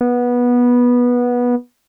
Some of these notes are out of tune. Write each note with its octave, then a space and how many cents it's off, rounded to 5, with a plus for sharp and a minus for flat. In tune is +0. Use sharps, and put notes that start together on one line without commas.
B3 -15